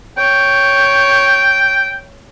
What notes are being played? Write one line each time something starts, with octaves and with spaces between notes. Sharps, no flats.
C#5 G5